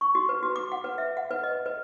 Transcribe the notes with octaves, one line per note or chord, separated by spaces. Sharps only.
C#6
F#4
B4
F#4
D6
F#5
B4
E5
F#5
B4
D#5
B4